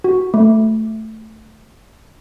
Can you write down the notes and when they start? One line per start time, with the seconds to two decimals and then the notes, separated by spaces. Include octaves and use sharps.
0.04 F#4
0.34 A3